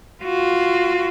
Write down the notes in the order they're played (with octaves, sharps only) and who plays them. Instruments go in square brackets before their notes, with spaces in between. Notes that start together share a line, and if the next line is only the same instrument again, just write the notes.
[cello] F4 F#4